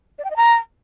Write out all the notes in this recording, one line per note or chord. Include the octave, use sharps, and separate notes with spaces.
D5
G5
D#5
A#5